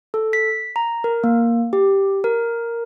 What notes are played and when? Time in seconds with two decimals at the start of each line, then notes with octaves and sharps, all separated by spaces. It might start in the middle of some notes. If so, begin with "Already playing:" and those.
0.14 A4
0.33 B6
0.76 A#5
1.04 A#4
1.24 A#3
1.73 G4
2.24 A#4